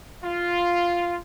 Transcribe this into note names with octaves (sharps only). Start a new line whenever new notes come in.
F4